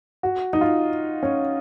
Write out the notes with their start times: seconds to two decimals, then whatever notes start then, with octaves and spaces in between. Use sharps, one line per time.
0.23 F#4
0.53 D#4
0.61 F4
1.23 C#4